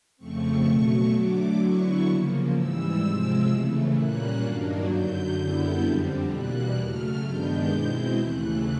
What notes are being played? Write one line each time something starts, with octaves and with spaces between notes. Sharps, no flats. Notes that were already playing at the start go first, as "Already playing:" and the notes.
F2 C#3 F3 A3 C4 C#6
B2 F#3 A3
D3 F#3 A3 D6
D3 F#3 B3 E4 C#6
C#3 F3 A#3
G#2 E3 G3 E6
C3 F3 G#3 C4
C#3 E3 A3
A#2 G3 A#3 C#4 F#6
G2 D#3 F#3 A#3 D4
F#2 D3 F#3 G6
F#2 D3 G3 B3 E4
F2 D3 G3 C4
E2 B2 G3 A#3 F#6
C#3 F#3 A3 F6
G2 D#3 G#3 B3 D4 G6
B2 G#3 C4 E4
D#2 C#3 E3 A3 F#6